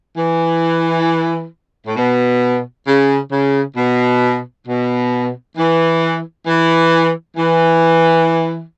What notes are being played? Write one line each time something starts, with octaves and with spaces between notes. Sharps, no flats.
E3
A2
B2
C#3
C#3
B2
B2
E3
E3
E3